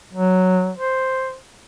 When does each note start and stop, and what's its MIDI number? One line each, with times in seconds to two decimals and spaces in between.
0.13 0.70 54
0.78 1.36 72